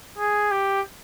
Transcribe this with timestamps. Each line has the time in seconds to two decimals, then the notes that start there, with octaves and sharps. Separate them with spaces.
0.18 G#4
0.51 G4